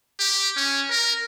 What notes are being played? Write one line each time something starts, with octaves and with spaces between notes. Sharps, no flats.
G4
C#4
A#4